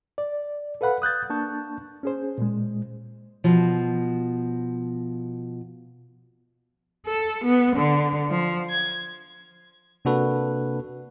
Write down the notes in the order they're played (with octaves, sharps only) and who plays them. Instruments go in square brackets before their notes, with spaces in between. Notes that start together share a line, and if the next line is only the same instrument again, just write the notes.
[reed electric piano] D5
A4 B4 F5 F#5 B5
D#6 F#6 G6 A6
A#3 D4 A5 C#6 G6
C#4 G#4 C5
A#2 G#3
[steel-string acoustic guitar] B2 F3
[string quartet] A4
B3
D3
F3
G#6
[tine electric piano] C3 A#3 D4 F#4 A4 B4